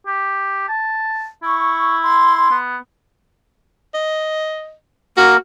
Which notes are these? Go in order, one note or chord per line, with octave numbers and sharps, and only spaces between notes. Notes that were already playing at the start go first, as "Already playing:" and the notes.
G4
A5
E4 C#6
C6
B3
D#5
A#3 F#4 A#4